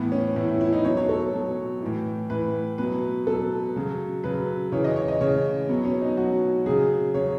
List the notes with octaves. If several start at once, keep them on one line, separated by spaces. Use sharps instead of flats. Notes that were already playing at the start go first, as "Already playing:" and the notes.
Already playing: A2 E3 B3
C#4
A2 E3 E4
E4
E4
D#4
B2 F#3 C#5
C#5
A4
B2 F#3
A2 E3
A2 E3 B4
B2 F#3 B4
B2 F#3 A4
C#3 F#3
C#3 F#3 B4
C#3 E3 C#5
D#5
C#5
D#5
C#3 E3 C#5
B2 F#3 B3
C#4
D#4
B2 F#3 F#4
C#3 F#3 G#4
C#3 F#3 C#5